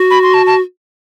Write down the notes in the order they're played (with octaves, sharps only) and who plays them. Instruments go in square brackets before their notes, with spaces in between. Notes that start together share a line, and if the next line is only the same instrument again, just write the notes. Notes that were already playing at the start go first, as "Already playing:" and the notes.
Already playing: [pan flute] F#4
[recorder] B5
C6
A5
A5